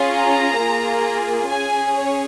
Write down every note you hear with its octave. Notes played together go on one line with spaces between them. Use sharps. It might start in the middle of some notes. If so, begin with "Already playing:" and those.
Already playing: C#4 F4 G#4
A#5
A#3 F4 G#4
C#4 G#4 G#5
C#5